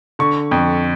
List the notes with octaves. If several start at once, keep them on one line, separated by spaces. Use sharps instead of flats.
D3 C#6
F2